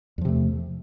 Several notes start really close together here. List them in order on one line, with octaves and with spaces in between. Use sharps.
E2 F3 C3 A3